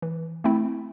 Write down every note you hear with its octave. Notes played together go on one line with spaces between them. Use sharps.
E3
A3 C4 E4